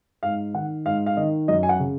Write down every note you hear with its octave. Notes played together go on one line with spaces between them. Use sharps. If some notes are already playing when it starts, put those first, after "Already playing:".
G#2 F5
D#3 F#5
G#2 F5
F5
D#3 D#5
F#2 D#5
G#5
F#5
C#3